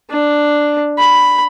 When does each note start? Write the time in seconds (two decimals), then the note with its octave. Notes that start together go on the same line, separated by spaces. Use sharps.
0.11 D4
0.99 B5